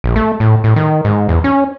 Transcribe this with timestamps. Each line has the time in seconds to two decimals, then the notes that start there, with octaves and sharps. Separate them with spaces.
0.04 A#1
0.16 A3
0.40 A2
0.64 A2
0.76 D#3
1.05 G#2
1.29 E2
1.44 C#4